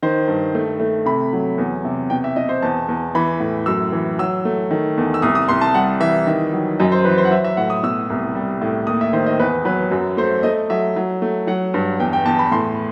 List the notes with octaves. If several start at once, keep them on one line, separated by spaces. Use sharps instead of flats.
D#3 C5
G2
A3
A3
C3 B5
F#3
E2
C3
B2 G5
E5
B2 D#5
C5
E2 A5
E2
E3 B5
A2
F#2 E6
E3
F#3 E6
A3
D#3
E2
E6
C2 D#6
D#6
C2 C6
A5
G3 F#5
E3 E5
D#3
F#3
F#2 D#5
C5
E3 B4
C5
F#5
F#3 E5
E5
A2 F#5
D#6
B2 E6
C2
G3
A2
D#2 D#6
E5
D#3 C5
D#5
E2 B4
F#3 B4
F#2
A3 C5
A3 D#5
F#3 E5
F#3
A3
F#3 F#5
G2
E2 G5
G5
E2 A5
B5
A2 C6